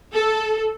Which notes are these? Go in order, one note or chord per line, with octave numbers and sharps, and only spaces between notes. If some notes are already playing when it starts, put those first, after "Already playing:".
A4